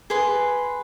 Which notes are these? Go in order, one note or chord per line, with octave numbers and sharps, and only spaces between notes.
G#4 B4 C6